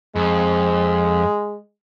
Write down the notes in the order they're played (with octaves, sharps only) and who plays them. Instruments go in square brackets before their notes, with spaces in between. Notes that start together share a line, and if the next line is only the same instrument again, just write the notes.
[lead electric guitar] F2 [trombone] G#3